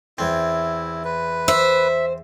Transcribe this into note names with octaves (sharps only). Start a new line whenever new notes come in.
E2 C4 E4
B4
C5 E5